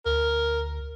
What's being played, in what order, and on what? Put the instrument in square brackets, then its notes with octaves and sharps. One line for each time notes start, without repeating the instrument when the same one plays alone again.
[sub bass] D2 [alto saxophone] A#4